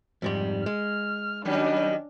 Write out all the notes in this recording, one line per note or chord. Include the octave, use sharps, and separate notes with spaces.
F2 G#2 G3
G#3 F6
D#3 F#3 G3 C#4 D4